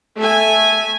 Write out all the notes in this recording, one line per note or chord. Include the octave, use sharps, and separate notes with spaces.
A3 E5 G#5